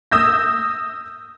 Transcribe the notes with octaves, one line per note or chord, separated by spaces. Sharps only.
D#6 E6 G6 A#6